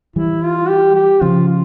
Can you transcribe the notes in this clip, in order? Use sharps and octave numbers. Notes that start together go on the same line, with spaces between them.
E3 G3 E4
F4
G4
G4
C#3 F3 F4
F4